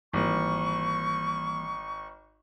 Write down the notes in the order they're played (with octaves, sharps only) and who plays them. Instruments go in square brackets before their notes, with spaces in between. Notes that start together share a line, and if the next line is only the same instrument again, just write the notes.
[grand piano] G#1 [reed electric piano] E3 G3 A#3 [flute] C#6